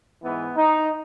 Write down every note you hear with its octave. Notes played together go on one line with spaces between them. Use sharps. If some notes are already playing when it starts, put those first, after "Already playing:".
G#2 E3 B3
D#4